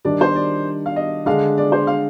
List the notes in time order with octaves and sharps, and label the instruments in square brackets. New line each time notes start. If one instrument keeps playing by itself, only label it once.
[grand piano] D#3 G3 D4 [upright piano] D5
[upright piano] C5
D5
F5
D#5
[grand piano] D3 G#3 D4 [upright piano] F5
[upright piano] D5
C5
F5